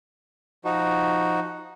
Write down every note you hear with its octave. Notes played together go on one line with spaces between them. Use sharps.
F3 D#4 F#4